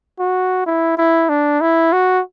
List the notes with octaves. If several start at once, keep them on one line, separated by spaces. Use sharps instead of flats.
F#4
E4
E4
D4
E4
F#4